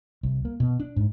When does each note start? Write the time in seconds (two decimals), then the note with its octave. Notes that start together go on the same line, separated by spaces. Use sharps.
0.23 C2
0.45 A#3
0.60 B2
0.80 D4
0.97 G#2